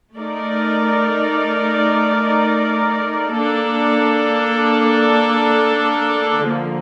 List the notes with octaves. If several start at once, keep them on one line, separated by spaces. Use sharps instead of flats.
A3 D#4 A#4 D5
A#3 D4 A4
D3 F3 A#3